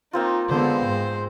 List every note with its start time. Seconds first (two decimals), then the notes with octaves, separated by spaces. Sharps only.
0.13 A#3 C4 D#4 F4
0.49 D3 G#3 B3 C5
0.84 G#2